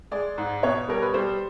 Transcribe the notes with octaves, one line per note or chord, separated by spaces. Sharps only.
G#3 D5
G#2
B2 C#5
G3 A#4
B4
G3 C5